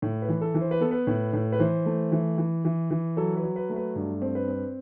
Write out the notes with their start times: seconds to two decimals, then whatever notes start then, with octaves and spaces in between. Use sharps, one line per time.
0.02 A2
0.22 B4
0.29 E3
0.41 A4
0.54 E3
0.61 C5
0.71 B4
0.81 B3 A4
0.91 B4
1.07 A2
1.33 A2
1.52 B4
1.60 E3 C5
1.86 A3
2.12 E3
2.38 E3
2.65 E3
2.91 E3
3.17 F#3 A4
3.36 B4
3.43 F#3
3.56 B4
3.70 A3
3.76 B4
3.96 G2
4.22 C4
4.35 B4
4.48 C4